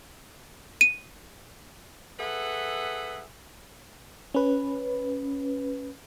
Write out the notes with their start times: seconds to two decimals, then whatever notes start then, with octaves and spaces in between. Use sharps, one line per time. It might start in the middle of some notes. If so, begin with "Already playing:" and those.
0.81 D#7
2.19 G#4 A4 B4 E5 F#5
4.34 C#4 B4